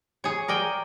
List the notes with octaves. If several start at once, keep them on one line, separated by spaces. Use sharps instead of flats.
G#4 C#5
A#4 D5 G5 G#5